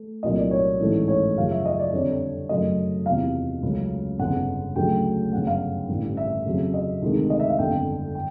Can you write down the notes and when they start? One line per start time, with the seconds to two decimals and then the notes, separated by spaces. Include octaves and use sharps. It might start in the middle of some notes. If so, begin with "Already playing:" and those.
Already playing: A3
0.23 C2 A#2 F#3 A3 D#5
0.37 D5
0.51 C#5
0.80 A1 G#2 E3 A3
1.08 C#5
1.36 F#2 C#3 F3 F5
1.51 E5
1.65 D#5
1.79 D5
1.93 F2 D3 G3 C#5
2.49 F#2 C#3 F#3 A3 D#5
3.06 E2 C3 F3 F5
3.63 C#2 C#3 F#3 A3
4.19 G1 F2 C#3 F#5
4.76 D2 C#3 F#3 A3 G5
5.33 G1 F#2 C#3 F#5
5.47 F5
5.89 A1 G2 D3
6.17 E5
6.45 F2 C#3 F#3
6.74 D#5
7.02 D2 C3 D#3 G#3
7.30 D#5
7.40 E5
7.49 F5
7.59 G1 F2 D3 G5
8.15 G5